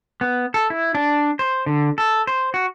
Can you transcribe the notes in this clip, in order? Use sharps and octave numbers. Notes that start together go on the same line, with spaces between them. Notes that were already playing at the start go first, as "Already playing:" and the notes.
B3
A4
E4
D4
C5
D3
A4
C5
F#4